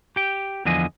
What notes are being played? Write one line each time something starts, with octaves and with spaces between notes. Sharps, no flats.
G4 G5
E2 D3 F3 D#5 G#5